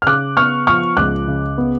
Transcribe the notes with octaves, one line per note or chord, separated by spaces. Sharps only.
F6
C#3 D6 F#6
B3 C#6 F6
F3 C#6 F6
C#2 D6 F#6
C#3
B3